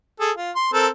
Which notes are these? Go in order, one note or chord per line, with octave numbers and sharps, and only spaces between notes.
G#4 A4
F4
C6
C4 A4 A#4